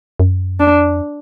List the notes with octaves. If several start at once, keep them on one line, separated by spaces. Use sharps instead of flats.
F#2
F2 D4